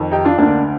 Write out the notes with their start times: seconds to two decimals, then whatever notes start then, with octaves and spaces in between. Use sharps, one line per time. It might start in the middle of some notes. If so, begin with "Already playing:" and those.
Already playing: F2 D#3
0.12 D#4 G4
0.25 D4 F4
0.38 D2 D3 A#3 D4